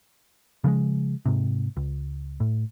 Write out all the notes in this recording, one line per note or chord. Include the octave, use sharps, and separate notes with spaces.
C#3 F3 G3 G#3
G#2 C3
C#2
A2